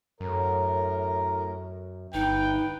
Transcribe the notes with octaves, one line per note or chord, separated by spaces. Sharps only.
F#2 A2 A#4
G1 D#4 B4 G5